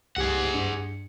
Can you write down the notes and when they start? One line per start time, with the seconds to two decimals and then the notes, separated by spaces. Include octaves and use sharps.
0.16 C2 G4 G#4 F#5 D#6
0.53 G2 D4 C#7